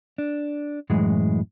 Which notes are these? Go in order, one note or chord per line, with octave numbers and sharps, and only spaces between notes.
D4
F#2 A2 E3 G#3